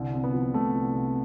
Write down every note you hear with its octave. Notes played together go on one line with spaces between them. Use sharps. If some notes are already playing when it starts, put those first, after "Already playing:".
Already playing: C2 D3
C3
B3
F3
C2 A3
C2
C3